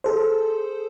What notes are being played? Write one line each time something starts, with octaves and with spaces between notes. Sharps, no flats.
G#4 A4 C5